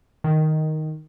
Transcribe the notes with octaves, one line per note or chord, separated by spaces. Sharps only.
D#3